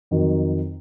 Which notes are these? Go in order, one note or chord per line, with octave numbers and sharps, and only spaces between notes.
F2 D#3 F#3